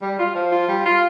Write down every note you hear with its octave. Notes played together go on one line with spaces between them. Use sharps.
G3
F4
F3
F4
G3
F4